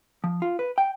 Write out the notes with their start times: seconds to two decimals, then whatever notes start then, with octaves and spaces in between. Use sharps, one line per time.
0.24 F3
0.42 F4
0.59 B4
0.78 G5